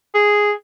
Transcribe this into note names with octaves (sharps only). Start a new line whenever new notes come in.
G#4